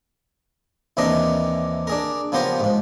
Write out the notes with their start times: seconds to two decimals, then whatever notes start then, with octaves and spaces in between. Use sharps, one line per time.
0.97 D#2 C3 E3 D4 A#4 D#5
1.87 D4 G#4 A#4
2.32 C#3 F3 B3 G4 A#4 C5
2.60 G#2 F3